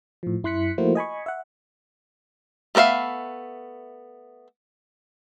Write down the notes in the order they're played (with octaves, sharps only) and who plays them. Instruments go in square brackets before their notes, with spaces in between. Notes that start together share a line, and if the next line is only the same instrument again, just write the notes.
[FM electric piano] A2 F3
F#2 E4 C6 F#6 B6 C#7
F3 A3 A#3 E4 F#4 C5
D#5 G#5 B5 C#6
E5 F#5
[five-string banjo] A3 B3 A#4 E5 F5